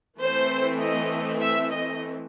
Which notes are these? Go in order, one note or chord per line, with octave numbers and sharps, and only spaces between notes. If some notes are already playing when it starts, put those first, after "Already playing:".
E3 A3 C4 C5
D#5
E5
D#5